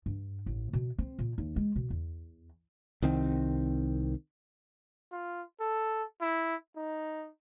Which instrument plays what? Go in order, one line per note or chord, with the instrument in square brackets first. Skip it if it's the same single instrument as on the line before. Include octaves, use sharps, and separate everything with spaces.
[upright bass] G2
A1
B2
C4
A#2
D#2
G#3
B2
E2
[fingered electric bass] C2 D#3 C4
[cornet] F4
A4
E4
D#4